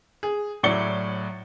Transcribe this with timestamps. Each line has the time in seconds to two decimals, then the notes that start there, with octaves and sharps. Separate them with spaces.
0.23 G#4
0.63 A2 F#3 E4 D5 C#7 G7